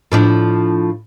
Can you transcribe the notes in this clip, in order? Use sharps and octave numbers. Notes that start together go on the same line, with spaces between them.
A2 F3 D4